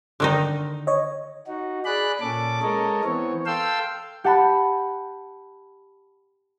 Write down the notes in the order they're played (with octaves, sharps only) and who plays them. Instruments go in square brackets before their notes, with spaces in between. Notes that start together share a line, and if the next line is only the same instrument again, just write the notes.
[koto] D3 D#3 D#4
[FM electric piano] C#5 D#5
[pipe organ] D#4 F#4
G#4 D5 B5 F#6
A#2 C#4 A4 D6
G#3 A4 A#4 C#5 D#5
E3 B3 C4 C#5
A4 F5 G5 C6 E6
[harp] G4 F#5 A5 B5